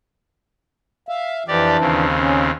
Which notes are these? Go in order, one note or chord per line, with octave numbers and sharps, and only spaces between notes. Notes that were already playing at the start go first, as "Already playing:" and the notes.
E5 F5
F2 E3 D4 G4 D5
D#2 C#3 C4
C#4